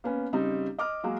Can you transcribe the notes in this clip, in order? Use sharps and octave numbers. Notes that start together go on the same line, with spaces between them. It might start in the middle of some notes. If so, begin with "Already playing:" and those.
A#3 B3 C#4
C#3 G3 C4 D#4
D#5 D6 F6
F#3 G#3 A#3 F#4